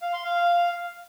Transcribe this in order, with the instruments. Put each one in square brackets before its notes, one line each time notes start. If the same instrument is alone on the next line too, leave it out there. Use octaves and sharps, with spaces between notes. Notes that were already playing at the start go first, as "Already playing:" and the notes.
[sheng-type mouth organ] F5
C6
F5